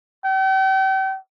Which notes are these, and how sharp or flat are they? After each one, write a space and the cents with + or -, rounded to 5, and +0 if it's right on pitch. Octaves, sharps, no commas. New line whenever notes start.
G5 -40